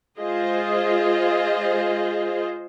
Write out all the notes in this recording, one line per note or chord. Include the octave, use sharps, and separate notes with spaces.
G#3 F4 G#4 C5 D#5